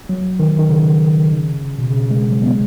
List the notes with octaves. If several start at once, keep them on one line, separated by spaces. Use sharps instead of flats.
F#3
D#3
D#3
C#3
B2
C#3
G#3
F#3
B3
G#3